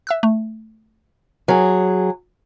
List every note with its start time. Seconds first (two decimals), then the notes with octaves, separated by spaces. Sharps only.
0.07 E5 E6 F#6
0.23 A3
1.48 F#3 G#4 A#4